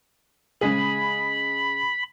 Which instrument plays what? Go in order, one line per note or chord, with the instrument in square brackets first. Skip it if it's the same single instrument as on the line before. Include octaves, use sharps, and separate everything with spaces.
[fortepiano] C#3 G#3 G#4 [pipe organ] B5